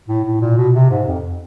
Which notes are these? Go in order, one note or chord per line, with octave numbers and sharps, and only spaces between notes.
A2
A2
A#2
B2
C3
G#2
F2